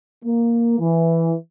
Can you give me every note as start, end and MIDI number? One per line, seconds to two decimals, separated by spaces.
0.25 0.75 58
0.80 1.34 52